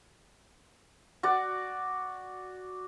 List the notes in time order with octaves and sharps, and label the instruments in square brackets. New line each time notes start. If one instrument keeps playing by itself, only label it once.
[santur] F#4 D5